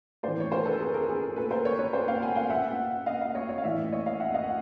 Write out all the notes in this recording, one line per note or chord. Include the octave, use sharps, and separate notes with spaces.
A2 E3 C5 D5
C#5
A#4 C5
A4 B4
G#4 A#4
G#4 A#4
G#4 A#4
A#2 A4 B4
A#4 C5
B4 C#5
B4 C#5
C5 D5
F5 G5
F#5 G#5
F5 G5
A#2 E5 F#5
D#5 F5
D#5 F5
C#5 D#5
C#5 D#5
F5
A2 E3 D5 E5
C#5 D#5
D#5 F5
E5 F#5
D#5 F5
F#5